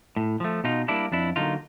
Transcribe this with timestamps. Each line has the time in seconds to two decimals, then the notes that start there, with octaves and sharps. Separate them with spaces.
0.16 A2
0.40 F3 A3
0.64 B2 D#4 F4
0.88 G3 A#3 D4 E4
1.12 F2 D4 E4
1.36 D3 F#3 A#3 D#4 F4